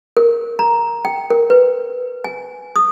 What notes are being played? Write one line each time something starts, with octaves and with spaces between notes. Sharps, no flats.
A#4
A#5
G5
A#4
B4
G#5
D#6